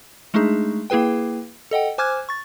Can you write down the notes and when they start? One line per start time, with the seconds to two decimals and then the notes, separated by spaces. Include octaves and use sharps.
0.34 G#3 A3 D4 D#4 G#4
0.90 A#3 E4 G#4 B4 G5
1.71 A4 D#5 F#5 G5
1.98 C5 G#5 D6 F6 F#6 G#6
2.29 C#6 A6